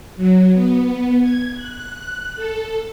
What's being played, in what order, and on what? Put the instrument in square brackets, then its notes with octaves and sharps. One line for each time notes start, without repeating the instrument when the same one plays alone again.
[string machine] F#3
B3
G#6
F#6
A4